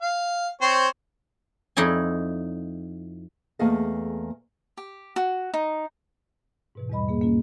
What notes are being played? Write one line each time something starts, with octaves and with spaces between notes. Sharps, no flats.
F5
C4 C5 C#5
F2 D#4 E4 D5 G#5
E2 A3 A#3 G#4 A4 D#5
G4
F#4
D#4
G#2 B2 E3
E2 A2 G3 D#5 B5
A#3 G#4
A#3 C#4 F4